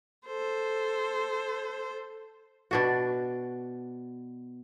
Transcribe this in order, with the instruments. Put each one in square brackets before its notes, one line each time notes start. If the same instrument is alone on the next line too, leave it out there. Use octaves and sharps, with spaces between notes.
[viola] A4 C5
[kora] B2 D4 F#4